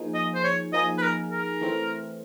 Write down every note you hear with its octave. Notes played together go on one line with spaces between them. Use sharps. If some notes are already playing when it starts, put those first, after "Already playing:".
Already playing: F3 A#3 D#4 G#4
D#5
C5
C#5
F3 A#3 D#4 G#4 D#5
B4
A#4
A#4
E3 A3 C4